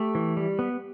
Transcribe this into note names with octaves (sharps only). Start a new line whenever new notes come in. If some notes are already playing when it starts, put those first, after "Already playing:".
Already playing: A3 G4
E3
G3
B3